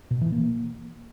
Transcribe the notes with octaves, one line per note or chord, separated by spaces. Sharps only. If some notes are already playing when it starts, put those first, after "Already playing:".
B2
E3
A#3